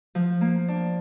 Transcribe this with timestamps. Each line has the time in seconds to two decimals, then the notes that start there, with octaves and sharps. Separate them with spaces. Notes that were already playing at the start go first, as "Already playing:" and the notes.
0.15 F3
0.41 A#3
0.68 D4